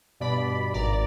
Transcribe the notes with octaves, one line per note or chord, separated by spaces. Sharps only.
G2 B2 D5 B5
G#1 D5 A#5